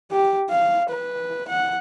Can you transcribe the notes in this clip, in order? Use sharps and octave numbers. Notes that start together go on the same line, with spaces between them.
G4
F5
B4
F#5